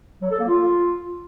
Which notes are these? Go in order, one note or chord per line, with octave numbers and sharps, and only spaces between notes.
F#3
A4
A#3
F4